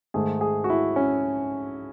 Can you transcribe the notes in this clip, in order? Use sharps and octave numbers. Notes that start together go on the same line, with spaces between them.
G#2 D#3 A3 G#4
G#4
F#4
E4
C#4